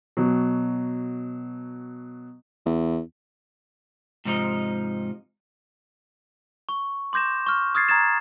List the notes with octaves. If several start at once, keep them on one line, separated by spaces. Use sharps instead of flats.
B2 F#3
E2
G#2 C3 F3 D#4 D#5
C#6
C6 D6 G6 A#6 E7
C#6 F6
D#6 F6 G#6 A6 C7
A#5 D#6 G#6 A6 E7